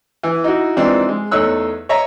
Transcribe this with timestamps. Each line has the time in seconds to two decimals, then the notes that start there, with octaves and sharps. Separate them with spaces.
0.23 E3
0.44 D#4 E4 F#4
0.77 E3 F3 G#3 C4 D4 D#4
1.09 G#3
1.31 E2 A3 D#4 C#5 E6 F#6
1.89 C#5 D#5 E5 A#5